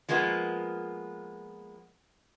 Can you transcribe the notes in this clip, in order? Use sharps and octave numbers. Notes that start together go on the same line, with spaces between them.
F3 G#3 A#3 B3 F4